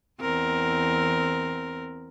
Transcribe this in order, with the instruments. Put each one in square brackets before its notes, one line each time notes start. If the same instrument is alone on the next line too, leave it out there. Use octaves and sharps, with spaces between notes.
[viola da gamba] E2 C4 A#4